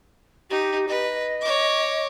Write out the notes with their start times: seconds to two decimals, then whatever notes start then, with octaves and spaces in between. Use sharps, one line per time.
0.50 D#4 G4
0.88 B4 D#5
1.41 C#5 D6